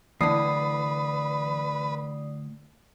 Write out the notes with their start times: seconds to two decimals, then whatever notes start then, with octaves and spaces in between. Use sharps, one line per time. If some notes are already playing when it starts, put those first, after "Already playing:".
0.21 A2 D3 E3 B4 D5 D#6 C7